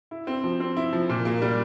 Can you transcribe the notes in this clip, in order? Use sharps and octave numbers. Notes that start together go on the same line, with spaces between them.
E4
C4
F3
C4
E4
F3
A#2
A#3
G3